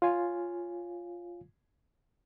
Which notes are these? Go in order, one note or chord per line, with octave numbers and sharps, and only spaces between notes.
F4 C#5 F5 G#5